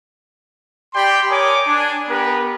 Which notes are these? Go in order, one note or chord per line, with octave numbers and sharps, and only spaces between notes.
G4 D5 G5 B5 C6
A#4 C#5 G#5 D6 D#6
D4 G#5
B3 G4 A#4 B4